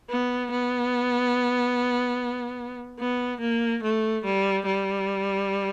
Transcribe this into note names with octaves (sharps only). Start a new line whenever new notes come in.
B3
B3
B3
A#3
A3
G3
G3